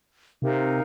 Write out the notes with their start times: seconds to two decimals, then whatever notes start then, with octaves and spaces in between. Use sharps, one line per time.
0.42 C3 D#4 A#4 F5